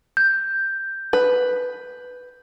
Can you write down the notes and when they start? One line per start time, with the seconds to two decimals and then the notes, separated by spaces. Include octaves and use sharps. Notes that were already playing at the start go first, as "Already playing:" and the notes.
0.17 G6
1.13 B4